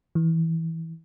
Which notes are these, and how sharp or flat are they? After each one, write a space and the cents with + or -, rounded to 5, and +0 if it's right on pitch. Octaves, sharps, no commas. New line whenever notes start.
E3 -15